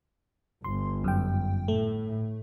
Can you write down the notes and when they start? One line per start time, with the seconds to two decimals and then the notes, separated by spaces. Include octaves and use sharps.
0.64 G1 C6
1.04 F#2 G5
1.68 A2 A3